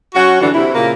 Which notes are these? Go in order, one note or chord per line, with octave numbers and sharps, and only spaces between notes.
F#3 C#4 F#4
G2 D3 E3 D4 F#4
C3 E4
A#2 C#3 A#3